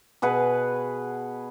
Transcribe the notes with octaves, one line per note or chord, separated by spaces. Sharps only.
B2 G#4 B4 F#5